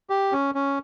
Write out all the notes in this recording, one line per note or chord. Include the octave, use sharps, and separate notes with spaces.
G4
C#4
C#4